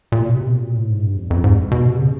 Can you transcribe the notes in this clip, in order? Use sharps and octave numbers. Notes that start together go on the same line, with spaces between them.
A#2
B2
C3
B2
A#2
A2
G#2
G2
F2
F2
G#2
B2
C3
C#3